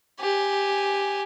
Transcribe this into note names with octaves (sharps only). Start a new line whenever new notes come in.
G4 G#5